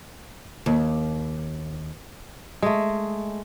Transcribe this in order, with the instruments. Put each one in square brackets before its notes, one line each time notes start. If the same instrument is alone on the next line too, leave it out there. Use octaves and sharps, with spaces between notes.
[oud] D#2
[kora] G#3 A3